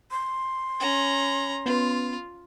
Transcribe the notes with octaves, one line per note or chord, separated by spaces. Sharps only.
C6
C#4 A#5
B3 C#4 F4 B4